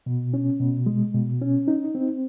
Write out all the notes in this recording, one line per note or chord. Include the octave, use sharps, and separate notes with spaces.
B2
C#4
B2
G#3
B2
C#4
D#4
C4